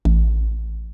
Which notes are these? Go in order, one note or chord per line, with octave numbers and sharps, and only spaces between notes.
A1